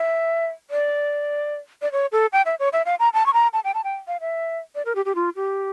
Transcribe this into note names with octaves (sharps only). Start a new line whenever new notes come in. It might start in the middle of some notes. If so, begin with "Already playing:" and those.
Already playing: E5
D5
D5
C#5
A4
G5
E5
C#5
E5
F5
A#5
A5
C#6
A#5
A5
G5
A5
G5
F5
E5
D5
A#4
G4
G4
F4
G4